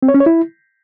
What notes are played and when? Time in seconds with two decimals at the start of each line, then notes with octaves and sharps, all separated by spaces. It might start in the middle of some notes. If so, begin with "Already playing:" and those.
0.02 C4
0.08 C#5
0.14 C#4
0.20 C#5
0.26 E4